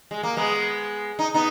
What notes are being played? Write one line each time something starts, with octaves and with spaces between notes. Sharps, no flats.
G#3
A#3
G#3 B3
D#4
B3 D#4